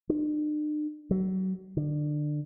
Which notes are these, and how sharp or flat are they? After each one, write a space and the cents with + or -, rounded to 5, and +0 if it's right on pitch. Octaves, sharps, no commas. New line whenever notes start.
D4 +45
F#3 +30
D3 +20